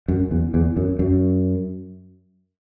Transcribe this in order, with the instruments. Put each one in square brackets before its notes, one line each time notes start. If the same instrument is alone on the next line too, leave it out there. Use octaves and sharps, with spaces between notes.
[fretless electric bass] F#2
E2
E2
F#2
F#2